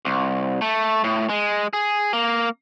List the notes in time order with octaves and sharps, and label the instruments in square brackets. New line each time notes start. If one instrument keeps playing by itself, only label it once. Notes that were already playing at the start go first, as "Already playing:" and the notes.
[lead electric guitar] C2
A3
A2
G#3
G#4
A#3